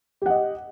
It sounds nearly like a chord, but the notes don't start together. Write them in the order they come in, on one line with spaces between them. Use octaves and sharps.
G4 F#5 D#5